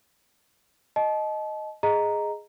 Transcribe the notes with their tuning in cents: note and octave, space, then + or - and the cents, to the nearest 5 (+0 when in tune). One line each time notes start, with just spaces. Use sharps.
D#5 +0 A5 -30
G#4 +0 D#5 +0 A#5 +0